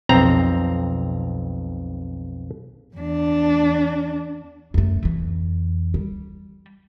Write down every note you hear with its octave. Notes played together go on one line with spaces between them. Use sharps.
B1 F2 C4 A#5
E2 D4
F#2 A3
F2 E3
G3